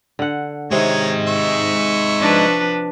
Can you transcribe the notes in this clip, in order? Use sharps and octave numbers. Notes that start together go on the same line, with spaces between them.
D3 F#5
C3 D#3 G#3 D#4 C#5 D#5
E5 C#6
F3 D4 B4